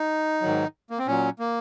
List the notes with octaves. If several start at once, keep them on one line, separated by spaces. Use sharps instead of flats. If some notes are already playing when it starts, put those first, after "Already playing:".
Already playing: D#4
G#2 D#3 F#3
A#3
C4
A#2 F#3 C#4
A#3